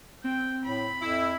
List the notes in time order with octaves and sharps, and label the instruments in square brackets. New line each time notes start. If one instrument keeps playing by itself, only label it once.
[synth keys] C4 [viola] G5
[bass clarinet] A2 [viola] B5
[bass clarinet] F2 [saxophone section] E4